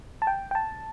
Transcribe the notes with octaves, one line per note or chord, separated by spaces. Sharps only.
A5
G5
G5
A5